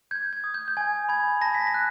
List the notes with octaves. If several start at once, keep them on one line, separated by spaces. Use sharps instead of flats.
G6 G#6
G#6
D#6
G6
G6
G#5 G#6
B5 G#6
A5 A#6
B6
A#6
F#6